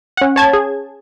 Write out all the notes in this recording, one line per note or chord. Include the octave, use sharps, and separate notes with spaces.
C#4 F#5
C#5 A5 G#6
G#4